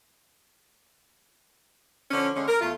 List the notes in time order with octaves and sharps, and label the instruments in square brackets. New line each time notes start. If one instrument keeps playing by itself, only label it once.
[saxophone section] D3 F3 C#4
D3 G#3 C#4
A#4
E2 A3 F4